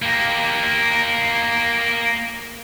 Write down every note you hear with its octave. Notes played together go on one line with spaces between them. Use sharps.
A#3 G4